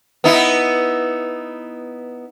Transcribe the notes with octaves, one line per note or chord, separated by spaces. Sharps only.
B3 D#4 E4